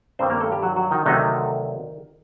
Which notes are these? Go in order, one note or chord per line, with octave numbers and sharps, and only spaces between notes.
G2 D#3 G3 C4 C5
A#3 A#4
A3 A4
G3 G4
F#3 F#4
F#3 F#4
D#3 D#4
D2 C3 D#3 F#3 A3 D#4